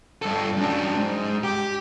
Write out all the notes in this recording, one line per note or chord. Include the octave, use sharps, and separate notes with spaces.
G2 A4
F#2 D4
G#2
G4